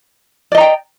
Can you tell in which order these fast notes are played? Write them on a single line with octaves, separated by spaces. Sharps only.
D5 D#5 A#5 G5